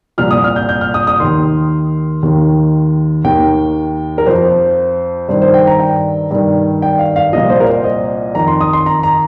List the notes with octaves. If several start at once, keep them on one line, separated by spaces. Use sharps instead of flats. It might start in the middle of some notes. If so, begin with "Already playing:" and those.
C2 A#2 F3 F6
D#6
F6
G6
G6
F6
D#6
D#6
D#2 D#3 C6
D#2 D#3
D#2 D#3 G5
A#4
F2 F3 C5
G2 D#3 C5
C5
G5
A#5
G5
G2 D#3
G5
F5
F5
C2 A#2 F3 D#5
C5
A#4
C5
D#5
F2 D#3 A#5
C6
D#6
C6
A#5
A#5